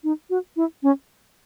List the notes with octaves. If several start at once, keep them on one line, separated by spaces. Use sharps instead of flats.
D#4
F#4
E4
C#4